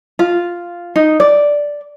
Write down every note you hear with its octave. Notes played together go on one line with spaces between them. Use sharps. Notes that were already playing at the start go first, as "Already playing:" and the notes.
F4
D#4
D5